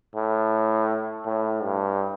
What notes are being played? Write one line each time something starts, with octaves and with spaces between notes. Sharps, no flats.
A2
A2
G2